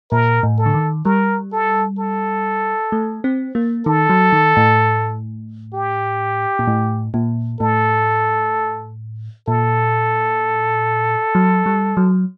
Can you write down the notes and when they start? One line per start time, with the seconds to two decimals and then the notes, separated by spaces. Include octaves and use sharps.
0.12 A#2 A#4
0.43 A2
0.58 A4
0.66 D3
0.74 D#3
1.05 G3 A#4
1.53 A4
1.99 A4
2.92 A3
3.24 C4
3.55 A#3
3.86 D#3 A4
4.10 F#3
4.33 D#3
4.57 A2
5.74 G4
6.59 A#2
6.67 A2
7.14 A#2
7.60 A2 A4
9.48 A#2 A4
11.35 F#3
11.66 G3
11.97 F#3